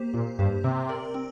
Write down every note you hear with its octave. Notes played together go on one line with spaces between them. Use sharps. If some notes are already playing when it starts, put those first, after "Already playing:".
Already playing: A#3 G4 C5
A#2 A#3
G2 G4 C5
C3 C4
A#4 D5
C4